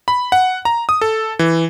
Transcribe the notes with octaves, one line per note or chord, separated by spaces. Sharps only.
B5
F#5
A#5
D#6
A4
E3